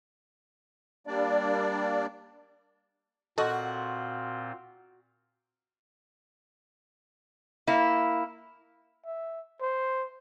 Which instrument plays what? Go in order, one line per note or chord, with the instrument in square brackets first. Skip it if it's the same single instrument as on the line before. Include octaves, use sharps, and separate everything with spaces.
[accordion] G3 A#3 D4 D5
[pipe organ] A#2 C4 F4 [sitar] F#4 [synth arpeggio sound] A4 D#5
[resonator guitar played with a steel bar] A#3 E4
[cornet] E5
C5